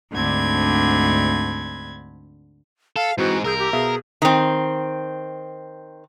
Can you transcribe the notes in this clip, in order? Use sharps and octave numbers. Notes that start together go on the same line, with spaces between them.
D2 G#2 D3 C4 B5 G#6
A4 F5
G#2 E3 C4 E4 F#4
C2 G#4 A#4 E6 G6
G4
B2 G#4 E5 F5
D#3 C4